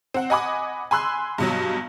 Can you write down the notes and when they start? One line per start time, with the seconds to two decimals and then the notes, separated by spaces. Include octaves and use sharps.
0.14 C4 F#5
0.30 D#5 F#5 G#5 B5 D6 D#6
0.91 G#5 B5 C6 E6 F#6
1.38 G2 B2 F#3